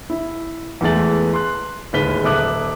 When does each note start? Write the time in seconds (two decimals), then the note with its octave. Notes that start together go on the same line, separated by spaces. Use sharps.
0.10 E4
0.81 E2 E3 G#3 A3 A6 F#7
1.34 C6 F#6
1.93 D1 D#2 G#3 B4 B6 G7
2.24 D#1 A4 E5 D6 D#6 F#6